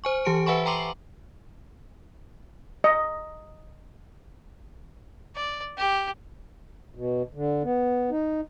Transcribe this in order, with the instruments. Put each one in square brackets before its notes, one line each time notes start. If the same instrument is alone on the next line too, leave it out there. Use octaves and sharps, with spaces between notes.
[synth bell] C5 G#5 C#6
E3 G4 A5 C#7 D7
B4 E5 F#5 G#5 B5 C#6
G5 A#5 C6 D6 C7 F#7
[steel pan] D#5
[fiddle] D5
G4
[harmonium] B2
D3
B3
D#4